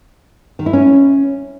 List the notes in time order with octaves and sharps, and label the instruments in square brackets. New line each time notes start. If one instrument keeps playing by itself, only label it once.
[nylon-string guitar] D#3
E4
C#4